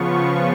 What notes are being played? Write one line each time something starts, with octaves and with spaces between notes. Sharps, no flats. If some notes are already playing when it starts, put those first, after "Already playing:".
Already playing: C#3 F3 B3 F4 C#6